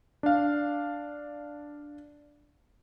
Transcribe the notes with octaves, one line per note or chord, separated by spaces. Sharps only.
D4 F5